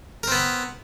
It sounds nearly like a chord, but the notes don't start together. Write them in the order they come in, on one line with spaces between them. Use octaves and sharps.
A#4 C4 B3